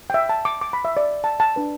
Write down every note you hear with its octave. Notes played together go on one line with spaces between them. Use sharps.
G5
E5
A5
D6
D6
B5
E5
D5
A5
A5
D4 B4